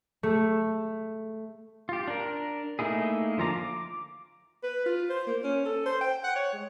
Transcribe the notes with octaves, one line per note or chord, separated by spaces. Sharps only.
A3
F4 G4
D4 A#4
A3 A#3 D#4 E4 G#4
D3 F3 F4 A#5 D6
D6
B4
F4
C5
A#3
C#4
A4
C5
G5
F#5
C#5
G#3